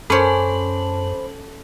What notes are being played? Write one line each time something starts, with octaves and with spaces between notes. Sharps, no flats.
F#2 C#4 A4 C5 C#5 A5 B5 F#7